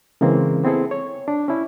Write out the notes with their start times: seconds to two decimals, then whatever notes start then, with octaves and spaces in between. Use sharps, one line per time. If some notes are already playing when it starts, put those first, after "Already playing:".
0.21 C#3 E3 G#3 A#3 C4
0.64 B3 C4 E4 G#4 A4
0.91 C#5
1.28 D4
1.48 C#4 E4